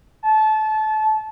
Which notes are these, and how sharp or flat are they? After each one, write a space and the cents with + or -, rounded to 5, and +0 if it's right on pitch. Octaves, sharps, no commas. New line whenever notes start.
A5 -25